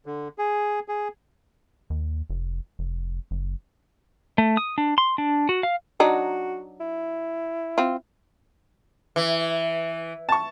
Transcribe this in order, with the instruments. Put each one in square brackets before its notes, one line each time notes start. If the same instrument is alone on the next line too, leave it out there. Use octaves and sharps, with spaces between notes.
[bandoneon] D3
G#4
G#4
[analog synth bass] D#2
F1
F1
F#1
[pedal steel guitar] A3
D#6
D4
C6
D4
F#4
F5
[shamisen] F#3 D4 D#4 [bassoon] F#4
[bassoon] E4
[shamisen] C4 F4
[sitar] E3
[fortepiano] A5 C#6